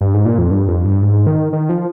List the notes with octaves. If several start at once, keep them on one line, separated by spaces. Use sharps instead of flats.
G2
G#2
A#2
F2
G2
F2
G2
G#2
D#3
D#3
F3